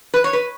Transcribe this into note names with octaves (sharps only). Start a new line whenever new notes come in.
B4
C#5
B4